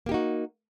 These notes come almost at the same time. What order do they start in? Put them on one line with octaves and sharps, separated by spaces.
A#3 G4 D#4 F#4